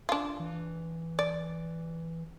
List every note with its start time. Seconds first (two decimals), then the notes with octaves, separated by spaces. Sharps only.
0.09 D4 F4
0.40 E3
1.19 D5